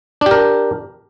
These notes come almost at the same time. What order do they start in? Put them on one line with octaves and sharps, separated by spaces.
D4 G4 A#4